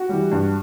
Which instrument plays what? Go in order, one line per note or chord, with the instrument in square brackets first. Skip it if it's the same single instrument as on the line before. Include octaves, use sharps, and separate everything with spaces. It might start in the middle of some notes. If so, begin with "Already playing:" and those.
Already playing: [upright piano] F#4
E3 G3
G2